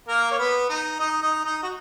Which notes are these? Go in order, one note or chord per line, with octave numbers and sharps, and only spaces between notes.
A#3 A#4
C#5
B3 B4
D#4 D#5
D#4 D#5
D#4 D#5
D#4 D#5
F#4